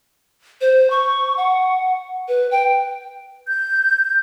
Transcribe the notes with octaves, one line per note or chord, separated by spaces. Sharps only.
C5
C#6
F#5
B4
G5
G6